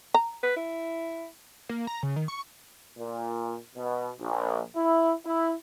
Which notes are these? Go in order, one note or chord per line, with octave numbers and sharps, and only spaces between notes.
A#5
B4
E4
A#3
A#5
C#3
D#3
C#6
A#2
B2
A#1
E4
E4